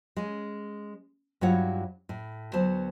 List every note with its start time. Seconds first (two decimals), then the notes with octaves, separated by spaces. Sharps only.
0.16 G#3 C#4
1.41 G2 F#3 E4 F4 C#5 F#5
2.09 A2
2.53 D2 F#3 B3 C5 A5